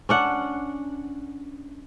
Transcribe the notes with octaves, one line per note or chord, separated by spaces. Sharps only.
C#4 D4 F#5